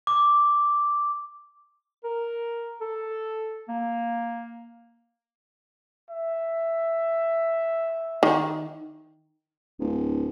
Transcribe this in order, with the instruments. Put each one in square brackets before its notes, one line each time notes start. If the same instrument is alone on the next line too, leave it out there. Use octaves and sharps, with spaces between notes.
[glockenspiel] D6
[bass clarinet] A#4
A4
A#3
[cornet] E5
[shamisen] D#3
[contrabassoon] D1